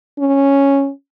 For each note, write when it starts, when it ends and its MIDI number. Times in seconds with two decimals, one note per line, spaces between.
0.19 0.90 61